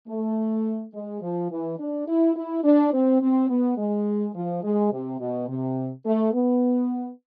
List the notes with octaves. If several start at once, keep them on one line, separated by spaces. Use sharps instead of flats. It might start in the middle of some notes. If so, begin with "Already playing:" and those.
A3
G#3
F3
E3
D4
E4
E4
D4
C4
C4
B3
G#3
F3
G#3
C3
B2
C3
A3
B3